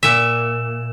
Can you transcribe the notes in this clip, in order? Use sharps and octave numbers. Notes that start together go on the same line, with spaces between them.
A#2 E5